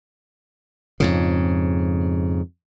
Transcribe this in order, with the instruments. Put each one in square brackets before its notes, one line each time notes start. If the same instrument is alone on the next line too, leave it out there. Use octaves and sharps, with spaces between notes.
[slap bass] F2 G#2 C#3